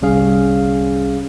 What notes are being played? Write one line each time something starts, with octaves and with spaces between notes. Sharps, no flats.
G1 C2 G3 C#4 G#4 F5